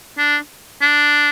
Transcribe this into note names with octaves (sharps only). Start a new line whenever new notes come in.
D4
D4